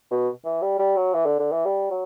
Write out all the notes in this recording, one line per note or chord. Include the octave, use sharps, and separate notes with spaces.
B2
E3
G3
G3
F#3
E3
D3
D3
E3
G3
F#3